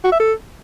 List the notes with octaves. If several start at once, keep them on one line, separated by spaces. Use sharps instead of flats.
F#4
E5
A4